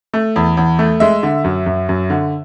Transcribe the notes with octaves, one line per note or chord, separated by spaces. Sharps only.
A3
E2
E2
A3
G#3 E5
D3
F#2
F#2
F#2
D3